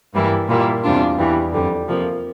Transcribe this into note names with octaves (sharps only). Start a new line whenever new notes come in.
G2 E3 G3 A#3 E4
A#2 G3 A#3 E4
E2 C3 G3 D4 F4
E2 E3 G3
F2 D3 G3
C3 F3 A#3